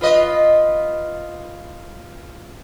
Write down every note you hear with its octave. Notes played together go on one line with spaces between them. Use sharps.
F4 B4 D#5